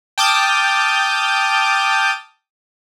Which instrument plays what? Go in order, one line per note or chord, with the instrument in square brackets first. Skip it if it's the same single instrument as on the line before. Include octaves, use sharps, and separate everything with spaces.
[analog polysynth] G5 A5 D6 D#6 F6 G6